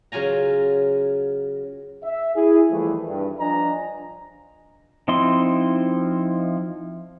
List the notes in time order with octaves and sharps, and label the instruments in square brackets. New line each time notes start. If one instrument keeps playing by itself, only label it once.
[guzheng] C#3 F#3 F4 G#5 A#5
[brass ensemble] E5
E4 G#4
D#2 E3 F3 G3 A3 E4
G2
F3 D4 D#5 G#5 A#5
[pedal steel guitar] F3 C4 D#4 E4 C6